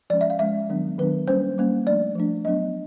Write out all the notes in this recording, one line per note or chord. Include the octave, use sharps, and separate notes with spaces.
F3 G#3 C#4 D5
E5
F5
F3 G#3 C#4 E5
D#3 F#3 B3 D4
D#3 F#3 B3 D4 B4
G3 A#3 C#4 C5
G3 A#3 C#4
F3 A3 D4 D5
F3 A3 D4
F#3 B3 D4 D#5